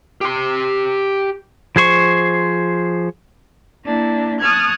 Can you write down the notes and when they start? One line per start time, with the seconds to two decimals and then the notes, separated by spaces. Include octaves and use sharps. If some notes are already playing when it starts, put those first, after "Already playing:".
0.21 G4 C6
1.76 F3 G#4 C5 C#6
3.83 A#3 D4 E4
4.39 A5 C#6 D#6 F6 F#6 G#6